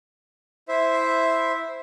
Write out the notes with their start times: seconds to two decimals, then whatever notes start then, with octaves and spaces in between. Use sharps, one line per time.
0.68 E4 C5 E5